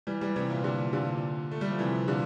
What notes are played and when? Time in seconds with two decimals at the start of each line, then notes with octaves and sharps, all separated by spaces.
0.07 E3 G3
0.21 E3 G3
0.36 C3 E3
0.50 A#2
0.64 A#2 D3
0.93 A#2 D3
1.51 A3
1.61 G3
1.70 F3
1.79 C3 E3
2.08 A#2 D3